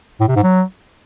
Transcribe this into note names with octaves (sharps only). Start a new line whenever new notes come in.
A2
C3
G#2
F#3